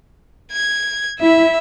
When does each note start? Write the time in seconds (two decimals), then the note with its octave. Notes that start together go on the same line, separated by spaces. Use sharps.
0.52 G#6
1.20 E4 E5